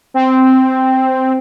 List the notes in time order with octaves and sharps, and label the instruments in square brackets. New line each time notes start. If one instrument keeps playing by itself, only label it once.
[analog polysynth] C4